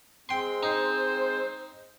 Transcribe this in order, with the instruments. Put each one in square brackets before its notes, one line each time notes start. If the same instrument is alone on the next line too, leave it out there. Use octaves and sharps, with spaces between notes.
[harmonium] G#3 C4 [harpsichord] G5 C6
[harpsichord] D#4 [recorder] C5